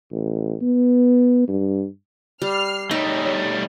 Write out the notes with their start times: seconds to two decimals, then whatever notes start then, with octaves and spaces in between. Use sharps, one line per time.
0.11 A1
0.62 B3
1.48 G2
2.42 G3 F6 C7
2.91 G3 A3 D#4 C#5